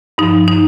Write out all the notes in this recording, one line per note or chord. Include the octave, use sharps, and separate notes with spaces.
G2 F3 D#4
D#4